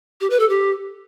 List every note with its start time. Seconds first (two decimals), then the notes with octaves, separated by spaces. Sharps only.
0.21 G4
0.30 B4
0.40 A4
0.49 G4